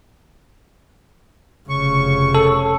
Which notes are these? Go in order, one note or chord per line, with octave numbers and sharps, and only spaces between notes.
F1 C#3 C#6
A4